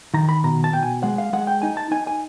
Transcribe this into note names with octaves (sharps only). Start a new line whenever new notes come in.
D#3 A#5
B5
B2 A#5
A5
B2 G5
G#5
G#3 F#5
F5
G#3 F#5
G5
D#4 G#5
A5
D#4 G#5
G#5